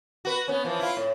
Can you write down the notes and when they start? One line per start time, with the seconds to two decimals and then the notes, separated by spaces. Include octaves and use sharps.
0.25 F#4 B4
0.48 B3 C#4
0.65 E3 F3
0.79 E4 F4
0.97 A2